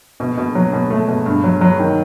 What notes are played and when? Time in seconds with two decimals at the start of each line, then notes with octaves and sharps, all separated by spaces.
0.20 B2
0.37 B2
0.55 F#3
0.73 B2
0.90 A3
1.08 B2
1.26 G2
1.44 F#3
1.61 F#3
1.80 D#3